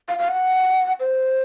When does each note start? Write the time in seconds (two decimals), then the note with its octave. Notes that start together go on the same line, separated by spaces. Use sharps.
0.08 F5
0.19 F5
0.29 F#5
1.00 C5